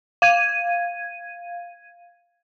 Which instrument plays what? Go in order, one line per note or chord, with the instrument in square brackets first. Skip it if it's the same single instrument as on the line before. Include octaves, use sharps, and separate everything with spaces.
[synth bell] F5 G#6 D#7